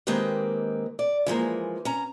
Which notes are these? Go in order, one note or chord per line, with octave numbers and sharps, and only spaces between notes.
D#3 G#3 A#3 C4 G4 B4
D5
E3 F3 G#3 A#3
C#4 A#5